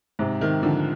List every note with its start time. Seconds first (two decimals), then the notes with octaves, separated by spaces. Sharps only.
0.19 G#2 C3
0.41 C3 D#3
0.63 D3 F3